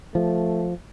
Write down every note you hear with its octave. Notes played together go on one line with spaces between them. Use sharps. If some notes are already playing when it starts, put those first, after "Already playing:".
F3 A3